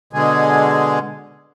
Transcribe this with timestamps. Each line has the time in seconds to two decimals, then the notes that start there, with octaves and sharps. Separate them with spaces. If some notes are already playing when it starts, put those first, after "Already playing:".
0.13 B2 D3 G#3 G#4